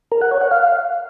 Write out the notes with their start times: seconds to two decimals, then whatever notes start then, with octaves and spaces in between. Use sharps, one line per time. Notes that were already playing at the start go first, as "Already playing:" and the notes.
0.12 A#4
0.22 F#5
0.31 C#5
0.41 F#5
0.51 F5